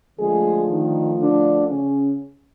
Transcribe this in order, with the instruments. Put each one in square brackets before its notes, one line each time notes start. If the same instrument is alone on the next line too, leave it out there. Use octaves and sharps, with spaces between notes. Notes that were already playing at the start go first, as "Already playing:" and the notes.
[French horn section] D3 F3 G#3 A3 G#4
D#3 D#4
D3 D4
C#3 C#4